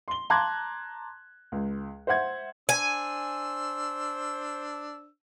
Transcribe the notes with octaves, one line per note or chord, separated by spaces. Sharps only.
C6 G7
A5 A#5 C6 D6 F#6 G#6
C#2
C5 E5 F#5 G#6
D4 C5 G#5 E6